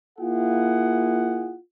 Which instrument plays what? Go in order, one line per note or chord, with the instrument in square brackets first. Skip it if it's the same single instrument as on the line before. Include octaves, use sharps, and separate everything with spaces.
[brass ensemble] A#3 E4 F4 G#4 F#5